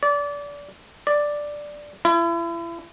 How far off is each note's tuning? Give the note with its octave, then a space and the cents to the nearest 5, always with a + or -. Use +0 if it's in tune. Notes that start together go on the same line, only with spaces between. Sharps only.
D5 -25
D5 +5
E4 +35